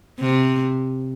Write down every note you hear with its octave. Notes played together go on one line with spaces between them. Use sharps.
C3